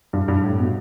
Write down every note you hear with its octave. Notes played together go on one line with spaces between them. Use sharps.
G2
G2
A2
B2